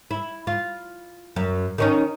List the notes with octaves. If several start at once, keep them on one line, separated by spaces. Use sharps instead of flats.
E4
F4
F#2
D#3 C#4 D#4